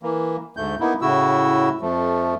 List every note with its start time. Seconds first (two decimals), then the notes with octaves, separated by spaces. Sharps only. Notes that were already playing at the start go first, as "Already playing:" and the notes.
0.03 E3 A#3
0.57 D2 G#2 A3 G6
0.80 A#3 B3 D#4 E4
1.02 A2 C#3 E4 F#4 E6
1.81 F2 F3 A3